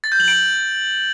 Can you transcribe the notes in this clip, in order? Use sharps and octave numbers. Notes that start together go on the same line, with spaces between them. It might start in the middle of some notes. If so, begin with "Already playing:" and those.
A6
G6
F#7
D7